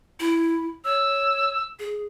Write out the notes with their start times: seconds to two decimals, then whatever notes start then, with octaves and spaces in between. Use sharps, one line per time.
0.20 E4
0.85 C#5 E6
1.79 G#4